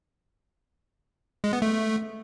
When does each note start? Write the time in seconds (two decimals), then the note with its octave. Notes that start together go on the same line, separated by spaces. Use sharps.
1.44 G#3
1.53 B3
1.62 A3